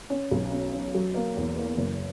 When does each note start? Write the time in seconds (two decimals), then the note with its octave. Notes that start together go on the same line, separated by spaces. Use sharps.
0.10 C#4
0.31 B1
0.52 C#4
0.72 C#4
0.95 F#3
1.14 A#3
1.37 E2
1.56 A#3
1.77 F#1